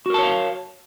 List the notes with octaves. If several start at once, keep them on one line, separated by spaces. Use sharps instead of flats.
F#4 A#4 C#5 F5 A5